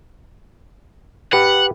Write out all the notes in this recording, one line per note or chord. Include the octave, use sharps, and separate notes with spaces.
G4 B4 F#5